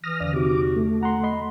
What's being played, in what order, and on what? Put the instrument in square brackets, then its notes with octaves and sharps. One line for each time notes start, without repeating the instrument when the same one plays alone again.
[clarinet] E3 [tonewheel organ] D#6 F6 A#6
[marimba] E2 D3 [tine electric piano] D5
[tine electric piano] C3 D#4 [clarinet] F#4 [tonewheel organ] D6
[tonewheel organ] A3
[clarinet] F#5 [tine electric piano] A#5 C6
[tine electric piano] D#5 B5 C6